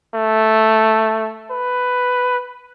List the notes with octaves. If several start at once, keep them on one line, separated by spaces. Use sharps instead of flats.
A3
B4